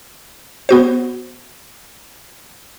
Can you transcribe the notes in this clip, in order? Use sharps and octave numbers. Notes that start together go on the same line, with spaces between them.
B3 F#4 C5